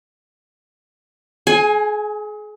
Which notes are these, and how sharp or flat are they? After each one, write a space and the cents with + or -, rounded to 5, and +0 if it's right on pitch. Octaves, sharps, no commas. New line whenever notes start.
G#4 +35 G#5 +0